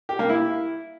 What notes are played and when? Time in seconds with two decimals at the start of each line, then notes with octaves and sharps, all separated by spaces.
0.09 G4
0.19 A#3
0.29 E4